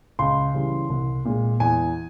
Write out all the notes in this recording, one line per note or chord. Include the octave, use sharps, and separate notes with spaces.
C#2 C6
C#3 E3 G3
C2
A#2 G#3
E2 G#5